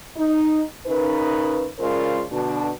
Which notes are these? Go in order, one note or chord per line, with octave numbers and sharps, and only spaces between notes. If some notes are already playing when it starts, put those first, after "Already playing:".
D#4
C#3 D#4 A#4 B4
C#3 G#3 F4 A#4 C5 D5
B2 D3 D4